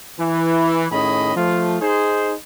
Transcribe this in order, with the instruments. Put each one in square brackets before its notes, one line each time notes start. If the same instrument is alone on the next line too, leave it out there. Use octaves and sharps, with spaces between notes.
[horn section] E3
A2 D#3 C#4 G#4 D#5 B5
F3 A3 F4
D#4 G#4 C5